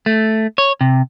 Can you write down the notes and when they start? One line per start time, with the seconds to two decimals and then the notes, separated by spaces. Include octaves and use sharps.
0.06 A3
0.58 C#5
0.81 C3